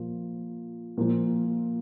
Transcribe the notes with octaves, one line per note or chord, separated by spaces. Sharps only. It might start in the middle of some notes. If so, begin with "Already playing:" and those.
Already playing: A#2 F3
A#2 F3